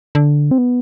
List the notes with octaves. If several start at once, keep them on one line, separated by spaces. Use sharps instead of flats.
D3
C4
B3